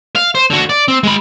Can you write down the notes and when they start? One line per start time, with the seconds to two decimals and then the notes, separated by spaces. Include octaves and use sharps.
0.15 F5
0.35 C5
0.50 D3 F#4
0.69 D5
0.88 C4
1.03 G#3 B5